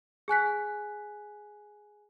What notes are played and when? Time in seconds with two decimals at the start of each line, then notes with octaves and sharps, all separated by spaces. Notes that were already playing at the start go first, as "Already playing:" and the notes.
0.28 G#4 G#5 F#6 B6